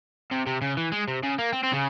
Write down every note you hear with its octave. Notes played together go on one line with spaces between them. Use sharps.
C3
C3
C#3
E3
G#3
C3
C#3
A#3
C4
C4
C#3